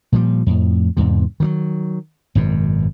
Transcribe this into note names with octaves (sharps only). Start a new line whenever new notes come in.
A#2 F3 G3
F2 A2
E2 G#2 C3
D#3 E3 F#3
G#1 F#2 B2